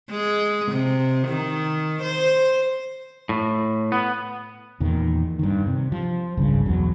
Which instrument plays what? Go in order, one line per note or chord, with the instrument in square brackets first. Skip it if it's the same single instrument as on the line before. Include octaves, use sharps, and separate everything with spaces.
[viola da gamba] G#3
C3
D#3
C5
[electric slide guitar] A2
B3
[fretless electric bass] E2 A#2 D#3
G2 D#3
C3
F3
G#1 C#2 G2 C#3
B1 E2 F#3